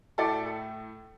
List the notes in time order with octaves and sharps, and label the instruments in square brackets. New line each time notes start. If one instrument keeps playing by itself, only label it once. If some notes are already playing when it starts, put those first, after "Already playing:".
[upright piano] A2 A3 A4 D5
A4